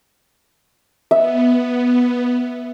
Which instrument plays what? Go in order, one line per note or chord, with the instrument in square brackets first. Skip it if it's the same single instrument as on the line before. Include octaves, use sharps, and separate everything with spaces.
[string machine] B3 [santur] E5